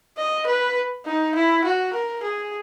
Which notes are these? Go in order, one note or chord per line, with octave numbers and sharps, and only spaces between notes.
D#5
B4
D#4
E4
F#4
A#4
G#4